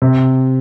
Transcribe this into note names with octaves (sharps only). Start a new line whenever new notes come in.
C3